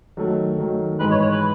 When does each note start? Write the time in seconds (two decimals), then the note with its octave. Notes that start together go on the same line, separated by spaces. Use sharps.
0.17 D#3 F#3 A3
0.58 D#3 F#3 A3
0.99 G#2 E3 G#3 D#4 B4
1.11 C#5
1.21 C#5
1.31 B4